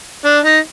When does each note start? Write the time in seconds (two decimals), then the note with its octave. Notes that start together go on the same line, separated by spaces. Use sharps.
0.24 D4
0.44 D#4